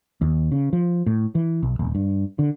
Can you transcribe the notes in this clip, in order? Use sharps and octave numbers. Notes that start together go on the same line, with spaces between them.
D#2
C#3
F3
A2
E3
B1
D#1
G2
D3